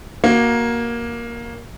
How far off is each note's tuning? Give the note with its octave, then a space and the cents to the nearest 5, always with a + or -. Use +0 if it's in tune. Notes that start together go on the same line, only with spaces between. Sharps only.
A#3 +10 F#4 +0 F5 +10